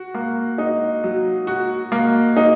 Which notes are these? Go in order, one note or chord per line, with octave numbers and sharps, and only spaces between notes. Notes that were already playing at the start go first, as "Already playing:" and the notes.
Already playing: F#4
A#3
D#4
F#3
F#4
A#3
D#4